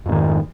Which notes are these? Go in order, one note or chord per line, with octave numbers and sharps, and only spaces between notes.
F2 G#2 D#3